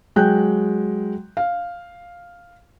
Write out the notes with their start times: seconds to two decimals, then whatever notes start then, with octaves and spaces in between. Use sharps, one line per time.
0.16 F#3 G#3 G5 F#6 G6
1.37 F5